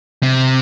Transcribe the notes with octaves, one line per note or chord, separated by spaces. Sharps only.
C3